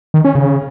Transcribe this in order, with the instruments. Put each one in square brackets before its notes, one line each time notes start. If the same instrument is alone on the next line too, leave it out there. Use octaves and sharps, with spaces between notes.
[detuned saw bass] D#3
C#4
C#3